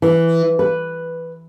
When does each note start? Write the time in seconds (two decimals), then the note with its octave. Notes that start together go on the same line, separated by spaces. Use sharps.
0.02 E3
0.59 B4